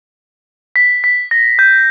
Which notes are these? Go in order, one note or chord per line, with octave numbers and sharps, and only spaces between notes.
B6
B6
A#6
G6